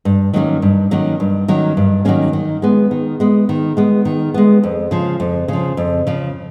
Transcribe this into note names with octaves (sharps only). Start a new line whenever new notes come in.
G2
D#3 F#3 A#3 C#4
G2
D#3 F#3 A#3 C#4
G2
D#3 F#3 A#3 C#4
G2
D#3 F#3 A#3 C#4
D#3
G#3 B3
D#3
G#3 B3
D#3
G#3 B3
D#3
G#3 B3
F2
C#3 F3
F2
C#3 F3
F2
C#3 F3